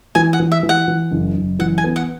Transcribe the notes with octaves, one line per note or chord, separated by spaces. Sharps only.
E3 G#5
F#5
E3
E5
E3
F#5
E3
F#1
F#1
E3 F#5
G#5
B3
F#5